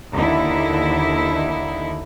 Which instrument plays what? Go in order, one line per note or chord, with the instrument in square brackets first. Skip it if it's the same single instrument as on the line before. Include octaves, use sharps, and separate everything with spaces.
[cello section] D#2 D3 D#4 E4